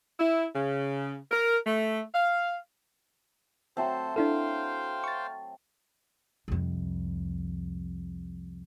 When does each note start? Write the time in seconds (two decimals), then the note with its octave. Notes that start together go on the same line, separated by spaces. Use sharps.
0.20 E4
0.55 C#3
1.32 A#4
1.66 A3
2.14 F5
3.77 F#3 A3 C4 A4 C5
4.16 D4 E4 A4 C5 F5 G5
5.04 C#6 A6
6.48 C2 F2